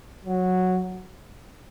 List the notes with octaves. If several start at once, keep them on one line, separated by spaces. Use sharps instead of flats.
F#3